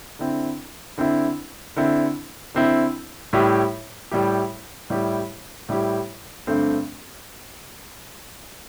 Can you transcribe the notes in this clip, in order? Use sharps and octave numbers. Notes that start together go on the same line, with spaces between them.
D3 C4 E4
D3 C4 E4
D3 C4 E4
D3 C4 E4
A2 G3 E4 G4
A2 G3 E4 G4
A2 G3 E4 G4
A2 G3 E4 G4
G2 D3 A3 C4